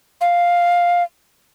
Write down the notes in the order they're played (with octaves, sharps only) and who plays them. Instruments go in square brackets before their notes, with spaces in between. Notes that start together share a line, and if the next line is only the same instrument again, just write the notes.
[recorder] F5